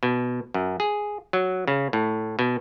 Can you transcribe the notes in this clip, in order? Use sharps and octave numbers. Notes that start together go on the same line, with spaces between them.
B2
F#2
G#4
F#3
C#3
A2
B2